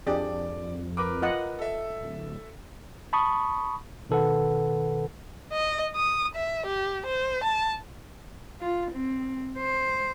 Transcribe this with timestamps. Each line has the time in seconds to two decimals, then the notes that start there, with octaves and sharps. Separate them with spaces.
0.07 F2 D4 G4 G#4 D5
0.97 A#4 B4 D6
1.22 F4 D#5 F#5
1.59 A4 E5
2.01 D1
3.13 A5 B5 C#6 D#6
4.09 B2 D#3 A4 B4 F#5
5.52 D#5
5.96 D#6
6.35 E5
6.66 G4
7.06 C5
7.44 A5
8.61 F4
8.92 C4
9.58 C5